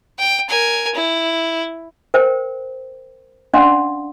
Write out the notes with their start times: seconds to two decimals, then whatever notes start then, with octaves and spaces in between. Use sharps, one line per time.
0.19 G5
0.49 A#4 G#5
0.95 E4
2.14 A#4 C5 G5
3.53 C#4 D4 D5 F5 F#5 C6